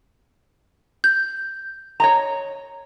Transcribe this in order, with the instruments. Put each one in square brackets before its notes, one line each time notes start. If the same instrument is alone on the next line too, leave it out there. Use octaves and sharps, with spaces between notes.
[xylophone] G6
[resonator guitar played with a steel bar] C#5 D#5 A#5